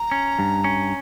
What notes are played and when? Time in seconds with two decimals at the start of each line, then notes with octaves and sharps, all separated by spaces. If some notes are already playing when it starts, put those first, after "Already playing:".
Already playing: A#5
0.11 C#4
0.39 G2
0.64 C#4